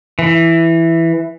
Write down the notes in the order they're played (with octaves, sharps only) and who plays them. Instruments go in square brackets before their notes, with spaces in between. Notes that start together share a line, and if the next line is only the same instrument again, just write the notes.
[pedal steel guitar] E3